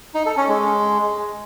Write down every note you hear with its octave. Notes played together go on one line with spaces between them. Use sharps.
D#4
A4
C#4
G#3